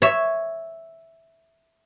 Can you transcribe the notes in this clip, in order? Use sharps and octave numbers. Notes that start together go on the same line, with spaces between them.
C#5 E5